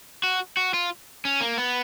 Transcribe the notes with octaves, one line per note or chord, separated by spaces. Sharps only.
F#4
F#4
F4
C#4
A#3
B3